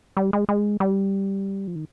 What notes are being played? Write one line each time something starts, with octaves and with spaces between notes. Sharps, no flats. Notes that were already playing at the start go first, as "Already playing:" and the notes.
G3
G#3
G#3
G3
F3
D#3